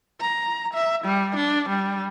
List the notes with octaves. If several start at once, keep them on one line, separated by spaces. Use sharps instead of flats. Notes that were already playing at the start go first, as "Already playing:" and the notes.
A#5
E5
G3
D4
G3